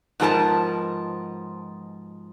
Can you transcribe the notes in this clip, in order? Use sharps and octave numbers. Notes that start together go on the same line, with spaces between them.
G#2 B2 F3 A4 A#4 A5